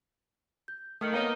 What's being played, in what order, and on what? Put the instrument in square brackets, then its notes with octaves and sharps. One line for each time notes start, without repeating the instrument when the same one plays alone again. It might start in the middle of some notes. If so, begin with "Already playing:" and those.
[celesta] G6
[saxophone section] D#3 [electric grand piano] A3 [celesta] D#6 F6 C#7
[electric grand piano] A#3 B3 A#4 [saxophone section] D#4 [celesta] C#5 F5